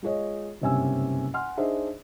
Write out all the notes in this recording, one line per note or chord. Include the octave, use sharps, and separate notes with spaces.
G#3 F4 G#4 C#5 D#5
F#1 G2 C3 C#4 G#5 E6
F#5 G#5 C6 F6
D4 D#4 G#4 C5 D#5 E5